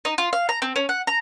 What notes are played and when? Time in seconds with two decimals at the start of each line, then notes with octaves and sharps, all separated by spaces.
0.05 D#4
0.18 F4
0.33 F5
0.49 A#5
0.62 C4
0.76 C#4
0.89 F#5
1.07 A#5